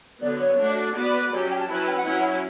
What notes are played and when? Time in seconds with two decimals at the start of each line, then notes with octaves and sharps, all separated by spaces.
0.21 D3 F#3 B3 D5
0.40 C#5
0.58 A3 D4 F#4
0.95 B3 F#4 B4 D5
1.32 F#3 C#4 G4 D5
1.40 E5
1.50 G5
1.59 A5
1.68 F#3 C#4 E4 B4 B5
1.77 A5
1.86 G5
1.96 F#5
2.05 F#3 C#4 E4